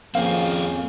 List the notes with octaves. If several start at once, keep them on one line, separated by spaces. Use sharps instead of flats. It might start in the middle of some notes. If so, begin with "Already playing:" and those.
F2 A#3 C4 C#4 G#4 F5